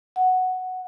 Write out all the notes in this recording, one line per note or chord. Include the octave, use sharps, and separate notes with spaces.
F#5